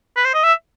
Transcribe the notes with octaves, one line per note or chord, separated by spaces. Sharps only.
B4
C5
D#5
E5